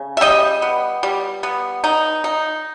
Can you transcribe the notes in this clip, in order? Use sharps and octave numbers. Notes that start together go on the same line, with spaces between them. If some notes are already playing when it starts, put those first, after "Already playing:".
Already playing: C#3
E5
G3 D#5 G5
B3
G3
B3
D#4
D#4